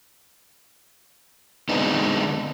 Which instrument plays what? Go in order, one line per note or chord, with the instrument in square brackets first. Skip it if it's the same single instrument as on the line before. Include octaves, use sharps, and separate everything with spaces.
[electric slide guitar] D3 G#3 B3 C4 D4 D#4